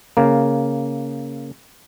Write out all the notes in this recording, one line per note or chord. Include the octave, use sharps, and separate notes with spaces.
C#3 A#3